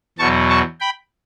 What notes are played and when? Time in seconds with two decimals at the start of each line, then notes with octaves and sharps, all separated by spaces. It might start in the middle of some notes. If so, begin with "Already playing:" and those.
0.19 E2 B2 F#3 A5 C#6
0.50 A5 C#6
0.80 G5 B5